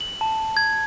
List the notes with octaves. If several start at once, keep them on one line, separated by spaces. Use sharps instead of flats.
F#7
A5
G#6